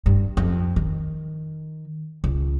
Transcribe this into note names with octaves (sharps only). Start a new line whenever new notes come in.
G2
F2
D#3
C#2